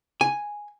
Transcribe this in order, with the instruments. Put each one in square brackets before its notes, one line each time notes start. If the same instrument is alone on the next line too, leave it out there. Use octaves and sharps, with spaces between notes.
[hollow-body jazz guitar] G#5